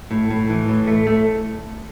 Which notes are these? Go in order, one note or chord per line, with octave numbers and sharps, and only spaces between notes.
A2
A2
E3
A2
A3
A3